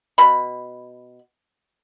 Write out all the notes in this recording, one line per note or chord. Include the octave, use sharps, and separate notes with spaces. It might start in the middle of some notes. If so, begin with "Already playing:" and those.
B2 B5